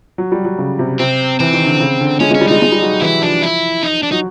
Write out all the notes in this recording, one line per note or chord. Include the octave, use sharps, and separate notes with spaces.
F#3
G3
F#3
C#3
C3
C3 C4
E3 C4
D#3
D3
C#3
D3
G#3 C#4
G#3 C#4
G3
G#3 D#4
G#3
G3
F#3
E3 E4
F3 D4
E4
D#4
D4
F#3 D#4